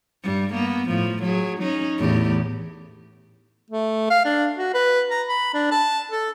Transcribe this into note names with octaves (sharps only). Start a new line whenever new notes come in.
G2 G3
A#3 B3
A2 F3
F#3 G#4
C#4 D#4
E2 A2 G4
A3
F5
D4
F#4
B4
A#5
B5
D4
A5
A4